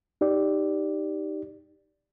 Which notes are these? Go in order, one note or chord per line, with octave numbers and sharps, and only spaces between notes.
D#4 G4 D5